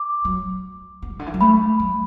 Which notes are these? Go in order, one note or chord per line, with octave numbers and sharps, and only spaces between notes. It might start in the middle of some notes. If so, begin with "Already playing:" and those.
Already playing: D6
F#3
B3
B2
D3
E3
F#3
A3 B5
F#3